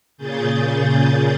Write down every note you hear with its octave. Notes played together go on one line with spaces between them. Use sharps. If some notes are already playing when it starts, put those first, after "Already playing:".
A#2 C#3 G#4 G6 A6